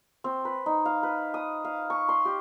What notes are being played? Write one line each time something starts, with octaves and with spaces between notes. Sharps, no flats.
C4
B4
D#4
F5
B4
D#6
F5
C#6
C6
G4